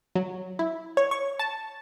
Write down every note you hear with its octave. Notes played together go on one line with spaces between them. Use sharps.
F#3
E4
C#5
C#6
A5